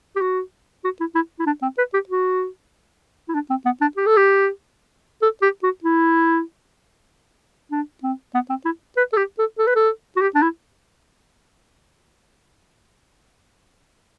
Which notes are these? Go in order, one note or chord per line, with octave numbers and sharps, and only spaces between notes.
G4
F#4
F#4
E4
E4
E4
D4
C4
B4
G4
F#4
E4
D4
C4
B3
D4
G4
A4
G4
A4
G4
F#4
E4
D4
C4
B3
C4
E4
B4
A4
G4
A4
A4
B4
A4
F#4
G4
D4
E4